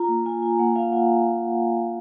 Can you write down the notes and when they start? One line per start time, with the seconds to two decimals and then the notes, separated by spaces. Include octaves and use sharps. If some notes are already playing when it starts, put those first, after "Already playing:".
Already playing: F4 A#5
0.08 A#3
0.26 F4 G#5
0.42 F4
0.59 A#3 F#5
0.76 F4 F5
0.92 F4 F#5